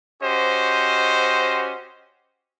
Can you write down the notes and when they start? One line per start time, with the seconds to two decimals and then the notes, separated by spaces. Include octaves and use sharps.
0.22 C#4 F#4 G4 C5 D#5